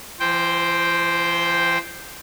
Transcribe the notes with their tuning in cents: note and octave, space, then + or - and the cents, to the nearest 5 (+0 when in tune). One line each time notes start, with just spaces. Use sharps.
E3 +45 C5 +0 G5 +0